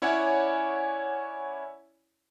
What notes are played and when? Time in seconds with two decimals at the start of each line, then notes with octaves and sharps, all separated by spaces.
0.02 C#4 E4 C#5 D5 F#5 G#5